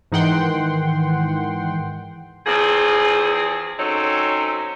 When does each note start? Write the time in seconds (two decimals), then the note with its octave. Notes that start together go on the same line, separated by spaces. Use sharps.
0.12 G#2 D#3 E3 F#5 G5 C6
2.46 E2 F3 C4 G#4
3.78 F#3 C4 C#4 D#4 A4